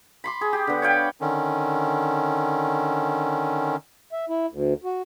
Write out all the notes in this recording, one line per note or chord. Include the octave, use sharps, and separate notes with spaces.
B5 C6 D6
G#4
G4
D3 B3
C#5 F5 G5 B5
D3 D#3 C#4
E5
E4
D2
F#4